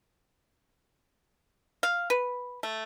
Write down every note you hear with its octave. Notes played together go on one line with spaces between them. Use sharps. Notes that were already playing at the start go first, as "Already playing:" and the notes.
F5
B4
A3